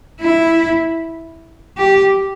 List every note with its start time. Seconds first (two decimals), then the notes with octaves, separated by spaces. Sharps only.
0.21 E4
1.77 G4